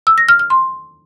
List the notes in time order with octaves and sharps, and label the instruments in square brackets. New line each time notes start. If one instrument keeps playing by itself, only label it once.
[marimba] E6
A#6
F6
F6
C6